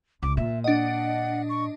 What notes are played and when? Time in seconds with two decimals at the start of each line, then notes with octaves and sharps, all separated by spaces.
0.23 C#2 D6
0.37 A#2 E5
0.64 D4 D#5 F#5
1.49 C#6